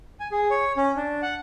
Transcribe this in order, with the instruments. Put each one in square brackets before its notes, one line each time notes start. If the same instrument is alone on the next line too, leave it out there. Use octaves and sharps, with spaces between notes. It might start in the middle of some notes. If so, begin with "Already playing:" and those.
[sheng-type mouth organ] G#5
G#4
C#5
C#4
D4
F#5